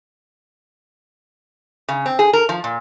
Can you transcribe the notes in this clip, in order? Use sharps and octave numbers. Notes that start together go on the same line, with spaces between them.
C#3
C4
G#4
A#4
F3
A#2